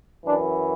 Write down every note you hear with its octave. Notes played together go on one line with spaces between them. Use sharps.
F#2 E3 D4